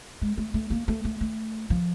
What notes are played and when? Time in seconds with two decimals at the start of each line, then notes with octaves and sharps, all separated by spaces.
0.22 G#3
0.37 A3
0.54 A3
0.70 A#3
0.88 A3
1.05 A3
1.21 A3
1.70 F3